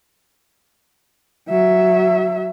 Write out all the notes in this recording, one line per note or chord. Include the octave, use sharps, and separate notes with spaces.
F#3 E5